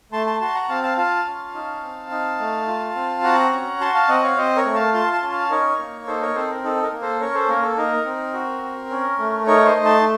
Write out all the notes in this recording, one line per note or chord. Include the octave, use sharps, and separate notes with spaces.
A3 A5 C6
A5 C6
F#4 A5 C6
F#5 A#5
C4 F5 A5
F5 A5
F4 F5 A5
C#4
D#4
C4
D#4
A3
F4
C4
F#4 F#5 A#5
C#4
F#4 A5 C6
F5 A5
C4 D#5 F#5
C#5 F5
C4 C5 D#5
A#4 C#5
A3
F5 A5
F4 A5 C6
A5 C6
C#4
F5 A5
D#4 A#4 C#5
A#3
D#4 A4 C5
A#4 C#5
C4 A4 C5
A#4
D#4 A4
A#4
A#3
A4 C5
C#4 A#4 C#5
A4 C5
A#3 A#4
A4
D#4 A#4
C4
F#4
C4
C#4
A3
D#4 A#4 C#5
C5 D#5
A3
A5 C6